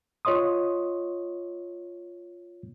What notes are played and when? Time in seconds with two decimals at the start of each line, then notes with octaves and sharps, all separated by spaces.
0.25 F4 C#5 D#5 C6 D#6